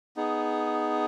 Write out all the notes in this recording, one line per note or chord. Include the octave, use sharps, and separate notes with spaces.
B3 D#4 G#4